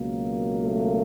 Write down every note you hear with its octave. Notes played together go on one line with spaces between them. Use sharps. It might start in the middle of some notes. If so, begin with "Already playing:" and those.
Already playing: C#2 B2 F#3 A#3
A3 A4